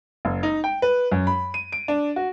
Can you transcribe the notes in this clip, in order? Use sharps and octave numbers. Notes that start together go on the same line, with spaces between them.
F#1
D#4
G5
B4
F#2
B5
D#7
D7
D4
F#4